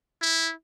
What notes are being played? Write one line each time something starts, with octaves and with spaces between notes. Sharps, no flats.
E4